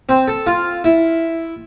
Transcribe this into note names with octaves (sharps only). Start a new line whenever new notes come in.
C4
A4
F4
E4